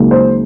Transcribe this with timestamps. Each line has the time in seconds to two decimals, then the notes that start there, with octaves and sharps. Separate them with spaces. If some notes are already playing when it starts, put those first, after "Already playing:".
Already playing: C#2 C#3 F#3 A#3 D#4
0.11 C5